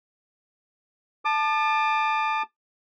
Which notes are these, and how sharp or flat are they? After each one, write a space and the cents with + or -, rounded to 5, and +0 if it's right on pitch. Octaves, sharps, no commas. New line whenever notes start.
A5 -5 D6 +40